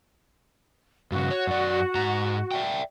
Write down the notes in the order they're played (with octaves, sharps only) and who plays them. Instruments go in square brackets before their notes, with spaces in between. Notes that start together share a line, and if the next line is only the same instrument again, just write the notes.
[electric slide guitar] G2 C#3 [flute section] F#4
[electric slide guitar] C#5
F#2 D5
G#2 A#5
D5 E5 G5